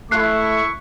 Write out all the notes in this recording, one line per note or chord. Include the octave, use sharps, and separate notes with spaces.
A3 E4 C#6 F#6 C7